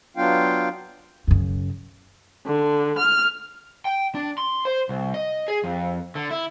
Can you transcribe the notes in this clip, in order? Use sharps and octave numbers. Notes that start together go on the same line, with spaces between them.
F#3 B3 D4 F4 F5 G5
F#2 C#3
D3
F6
G5
D4
C6
C5
C2
D#5
G#4
F2
D3
E4